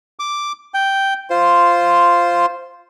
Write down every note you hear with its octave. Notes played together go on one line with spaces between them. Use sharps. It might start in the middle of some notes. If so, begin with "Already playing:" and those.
D6
G5
F4 C5